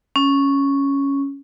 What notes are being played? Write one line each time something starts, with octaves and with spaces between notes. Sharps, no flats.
C#4